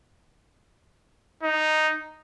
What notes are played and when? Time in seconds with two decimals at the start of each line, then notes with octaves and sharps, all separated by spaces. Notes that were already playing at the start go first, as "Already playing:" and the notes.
1.43 D#4